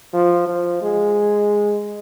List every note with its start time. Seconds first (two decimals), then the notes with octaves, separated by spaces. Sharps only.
0.13 F3
0.48 F3
0.82 G#3